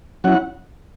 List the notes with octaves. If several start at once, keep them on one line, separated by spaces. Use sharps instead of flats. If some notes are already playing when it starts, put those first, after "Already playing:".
F#3 C#4 E4 F#5